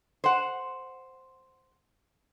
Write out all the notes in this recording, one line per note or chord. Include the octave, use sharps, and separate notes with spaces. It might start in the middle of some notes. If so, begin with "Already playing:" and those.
C5 F#5